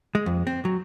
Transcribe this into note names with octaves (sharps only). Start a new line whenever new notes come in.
G#3
F2
C4
F#3